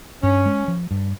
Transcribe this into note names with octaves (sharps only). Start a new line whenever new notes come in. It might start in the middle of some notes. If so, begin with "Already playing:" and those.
G2 C#4
G#3
F3
G2